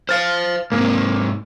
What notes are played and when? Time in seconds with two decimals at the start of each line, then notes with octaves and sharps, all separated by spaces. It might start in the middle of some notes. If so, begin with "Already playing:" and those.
0.09 C5 F5 F6 A6
0.72 G#2 C3 A#3